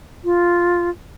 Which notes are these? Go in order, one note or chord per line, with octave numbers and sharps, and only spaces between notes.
F4